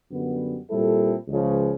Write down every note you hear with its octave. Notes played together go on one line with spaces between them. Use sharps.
F#2 D3 G3 B3
A#2 G3 C4 E4 A4
C#2 C#3 F3